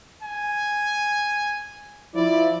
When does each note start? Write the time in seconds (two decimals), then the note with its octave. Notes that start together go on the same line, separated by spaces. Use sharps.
0.23 G#5
2.15 F3 E4 D5